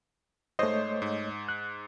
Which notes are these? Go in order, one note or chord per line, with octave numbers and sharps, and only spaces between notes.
G#2 A3 C5 C#5 D#5
G#2
F#6